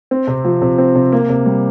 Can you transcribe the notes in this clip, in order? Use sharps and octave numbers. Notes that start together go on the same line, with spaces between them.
C4
C3
F3
C3
C4
C3
A#3
C3
G3